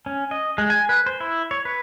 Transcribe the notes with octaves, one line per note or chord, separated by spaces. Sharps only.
C#4
D#5
G#3
G#5
B4
C5
E4
C#5
B4